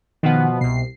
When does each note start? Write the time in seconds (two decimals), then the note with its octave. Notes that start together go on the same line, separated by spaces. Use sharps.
0.23 B2 D#3 F3 B3 F#5
0.61 C2 B2 C7